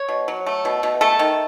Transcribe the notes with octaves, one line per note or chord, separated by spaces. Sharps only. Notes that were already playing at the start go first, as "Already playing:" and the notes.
Already playing: C#5
B2
F#3
A3
B2
B2
A3 A4
D#3